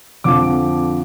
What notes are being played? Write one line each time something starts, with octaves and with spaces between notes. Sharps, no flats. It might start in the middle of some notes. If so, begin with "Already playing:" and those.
F2 D3 F3 D6